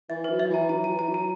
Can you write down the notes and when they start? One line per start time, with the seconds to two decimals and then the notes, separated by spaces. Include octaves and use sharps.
0.09 E3 E5
0.24 F#3 B4
0.39 E5
0.49 E3 A#5
0.69 F#3 A#5
0.84 A#5
0.89 E3
0.99 A#5
1.09 F#3
1.14 A#5